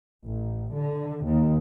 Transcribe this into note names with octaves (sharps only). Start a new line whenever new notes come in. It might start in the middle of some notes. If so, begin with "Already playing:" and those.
A1
D3
D#2